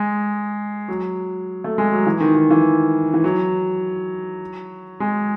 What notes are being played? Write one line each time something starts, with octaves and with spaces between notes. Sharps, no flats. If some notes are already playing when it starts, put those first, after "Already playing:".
Already playing: G#3
F#3
A3
G#3
F#3
E3
D#3
D#3
E3
E3
F#3
G#3